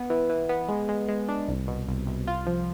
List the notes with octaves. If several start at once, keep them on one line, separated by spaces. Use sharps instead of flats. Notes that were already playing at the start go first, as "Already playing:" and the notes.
Already playing: B3
E3
E3
B3
G#3
G#3
G#3
D4
C2
B2
C2
C2
F4
F3